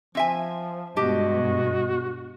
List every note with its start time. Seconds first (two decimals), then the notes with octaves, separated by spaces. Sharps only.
0.15 F3 C4 E5 G#5
0.96 G2 B2 G#3 F#4 G4 D#5 A5